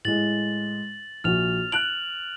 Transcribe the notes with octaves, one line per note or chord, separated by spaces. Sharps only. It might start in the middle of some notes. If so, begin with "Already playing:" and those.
A2 G#3 A6 F#7
A#1 F#4 F6 F7
F#6 D7 F#7